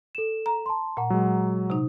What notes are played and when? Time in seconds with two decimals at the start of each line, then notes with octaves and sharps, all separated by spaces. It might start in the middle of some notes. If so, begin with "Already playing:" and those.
0.15 A4 E7
0.46 A#5
0.66 A5 C6
0.97 A#2 F#5 A#5
1.10 F#3 G#3
1.70 C3 D#4